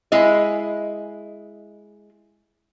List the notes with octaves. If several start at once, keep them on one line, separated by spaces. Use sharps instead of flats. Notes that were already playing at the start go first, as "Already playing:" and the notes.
G#3 E4 D#5